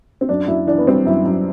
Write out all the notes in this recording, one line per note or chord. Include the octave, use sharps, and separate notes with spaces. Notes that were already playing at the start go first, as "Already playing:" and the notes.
C4
F#2 D4
F#2 E4
E3 D4
B3
G3 C4
F#2 E4
F#2